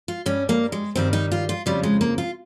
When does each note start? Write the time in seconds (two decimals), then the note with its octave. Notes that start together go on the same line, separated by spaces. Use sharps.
0.08 F4
0.26 G2 G3 C#4
0.49 A#3
0.72 G#3
0.95 G2 D#3 G3 C4
1.13 D#4
1.32 F4
1.49 F4
1.66 F2 C#3 F3 G3
1.83 G#3
2.01 A#3
2.18 F4